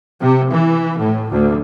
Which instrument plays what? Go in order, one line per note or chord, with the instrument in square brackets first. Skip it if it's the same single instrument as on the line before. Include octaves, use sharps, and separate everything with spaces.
[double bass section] C3
E3
A2
D2